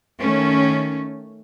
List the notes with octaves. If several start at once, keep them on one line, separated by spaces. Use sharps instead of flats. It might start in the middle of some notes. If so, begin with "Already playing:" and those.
D#3 A3 C#4